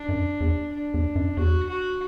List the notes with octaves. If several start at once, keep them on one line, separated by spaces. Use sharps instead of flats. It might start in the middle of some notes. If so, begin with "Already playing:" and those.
Already playing: D4
F#2
E2
D4
E2
F#2
E2 F#4
F#4